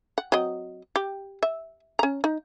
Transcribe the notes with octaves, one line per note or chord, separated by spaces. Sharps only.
F#5
F#3 C4 D#5
G4
E5
C#4 A#5
D#4